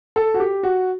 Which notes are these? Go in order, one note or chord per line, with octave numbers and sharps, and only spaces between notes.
A4
F#4
G4
F#4